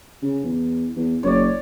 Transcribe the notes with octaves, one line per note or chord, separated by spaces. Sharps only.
C#3
E2
E2
F#1 C#5 D5